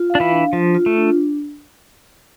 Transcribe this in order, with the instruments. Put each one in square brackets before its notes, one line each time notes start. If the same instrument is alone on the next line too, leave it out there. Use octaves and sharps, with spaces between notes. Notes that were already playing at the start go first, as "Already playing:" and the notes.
Already playing: [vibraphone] F4
F5
[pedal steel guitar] D4
E3 E4
[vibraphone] D4
[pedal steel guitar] F3 [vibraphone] F4
[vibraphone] F4
[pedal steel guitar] A3
[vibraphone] D4